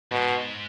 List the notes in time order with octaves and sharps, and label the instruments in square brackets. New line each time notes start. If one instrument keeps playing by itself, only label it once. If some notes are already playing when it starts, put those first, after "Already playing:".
[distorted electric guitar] G#2 [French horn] B2